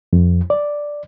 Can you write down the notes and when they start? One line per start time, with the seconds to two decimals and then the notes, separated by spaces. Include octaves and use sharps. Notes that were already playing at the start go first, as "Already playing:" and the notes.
0.13 F2
0.50 D5